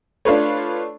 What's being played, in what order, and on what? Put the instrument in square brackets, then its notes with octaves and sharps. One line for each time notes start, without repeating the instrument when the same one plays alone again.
[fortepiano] A3 D4 [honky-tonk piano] F4 B4 C#5